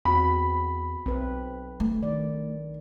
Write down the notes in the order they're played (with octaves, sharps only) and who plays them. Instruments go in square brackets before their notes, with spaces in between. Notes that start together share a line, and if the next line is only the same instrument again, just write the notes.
[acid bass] E2 [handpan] C4 F#4 [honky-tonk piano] B5
[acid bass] B1 [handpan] C4 B4
[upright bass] A3
[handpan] D#3 D5